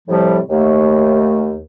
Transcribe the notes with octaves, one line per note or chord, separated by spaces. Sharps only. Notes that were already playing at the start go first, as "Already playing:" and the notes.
A2 C3 F3 G3
D#2 A3